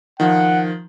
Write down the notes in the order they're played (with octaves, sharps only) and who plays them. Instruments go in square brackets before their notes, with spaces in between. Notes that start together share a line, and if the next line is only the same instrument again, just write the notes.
[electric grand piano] D#3 F3 [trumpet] F#5